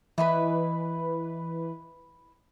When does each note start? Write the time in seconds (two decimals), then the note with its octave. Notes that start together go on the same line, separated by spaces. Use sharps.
0.18 E3 E4 B4 D#5 B5